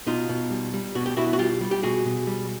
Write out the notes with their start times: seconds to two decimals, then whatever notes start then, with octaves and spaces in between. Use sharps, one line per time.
0.07 B2 D#4 F4
0.29 B2
0.50 G3
0.74 G3
0.95 B2 F#4
1.06 G4
1.17 B2 E4 F#4
1.33 F#4
1.38 G3 F4 G4
1.61 G3
1.71 G4
1.83 B2 F#4 G#4
2.05 B2
2.27 G3